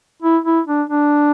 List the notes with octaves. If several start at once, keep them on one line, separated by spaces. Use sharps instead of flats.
E4
E4
D4
D4